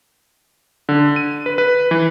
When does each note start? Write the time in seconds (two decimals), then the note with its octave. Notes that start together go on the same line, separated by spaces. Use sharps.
0.89 D3
1.16 D#7
1.46 B4
1.58 B4
1.91 E3